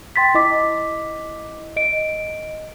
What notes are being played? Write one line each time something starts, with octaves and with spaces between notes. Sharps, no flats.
G5 C6 A6 B6
E4 D#5 D6 B6
D#5 D7